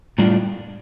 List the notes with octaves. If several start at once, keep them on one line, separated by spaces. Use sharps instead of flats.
A2 G3 D4 F4